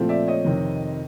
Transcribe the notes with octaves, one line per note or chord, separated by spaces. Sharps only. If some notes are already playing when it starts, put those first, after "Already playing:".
Already playing: A#2 F3 A3 C4
D5 E5
C#5 D#5
F2 C3 D#3